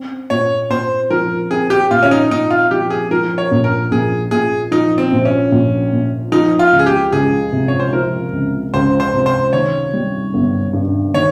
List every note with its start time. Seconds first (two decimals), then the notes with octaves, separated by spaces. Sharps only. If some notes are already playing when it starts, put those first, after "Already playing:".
Already playing: C4
0.30 A#2 C#5
0.70 A#2 C5
1.10 F3 A#4
1.50 C4 G#4
1.70 G4
1.91 A#2 F4
2.03 C#4
2.11 D#4
2.31 A#2 D#4
2.50 F4
2.71 F3 G4
2.90 G#4
3.11 F3 A#4
3.38 C#5
3.51 A#1
3.64 A#4
3.91 A#1 G#4
4.31 A#2 G#4
4.71 F3 D#4
4.98 C4
5.12 A#1
5.25 C#4
5.52 A#1
5.92 A#2
6.32 F3 D#4
6.59 F4
6.73 C#2
6.79 G#4
6.86 G4
7.12 C#2 G#4
7.52 C3
7.68 C#5
7.80 C5
7.93 F3 A#4
8.33 C#2
8.73 C#2 C5
9.00 C5
9.14 C3
9.26 C5
9.53 D#3 C#5
9.93 G3
10.34 G1
10.73 G2
11.14 D#3 C#5